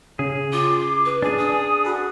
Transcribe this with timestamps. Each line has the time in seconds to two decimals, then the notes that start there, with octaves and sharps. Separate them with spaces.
0.19 C#3 G#4
0.53 F4 D6
1.05 B4
1.22 D4 G#4 G#5
1.38 D#6
1.85 F#4 A4 B4